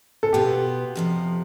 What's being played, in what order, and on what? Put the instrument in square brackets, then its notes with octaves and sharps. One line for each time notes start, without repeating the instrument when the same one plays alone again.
[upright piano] A4
[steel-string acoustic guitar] B2 B3 F4 [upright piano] G4
[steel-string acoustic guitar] F2 C3 F3